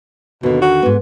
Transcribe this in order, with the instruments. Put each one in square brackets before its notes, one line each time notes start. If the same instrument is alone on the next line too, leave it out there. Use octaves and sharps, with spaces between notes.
[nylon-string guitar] D#2 D3 [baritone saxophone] B2
[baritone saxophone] F#4
[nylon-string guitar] G#2 B3